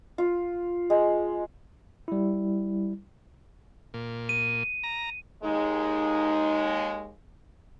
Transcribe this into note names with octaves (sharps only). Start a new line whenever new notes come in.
F4
G#3
G3 E4
A#2
D#7
A#5
D#2 G#3 D#4